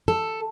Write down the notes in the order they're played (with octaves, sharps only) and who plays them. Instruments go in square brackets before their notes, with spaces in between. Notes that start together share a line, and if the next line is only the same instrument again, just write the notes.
[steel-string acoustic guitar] A4